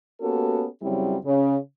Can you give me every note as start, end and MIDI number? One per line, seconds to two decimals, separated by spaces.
0.22 0.66 58
0.22 0.66 59
0.22 0.66 61
0.22 0.66 66
0.22 0.66 67
0.22 0.66 69
0.82 1.17 42
0.82 1.17 49
0.82 1.17 54
0.82 1.17 55
0.82 1.17 60
0.82 1.17 64
1.26 1.57 49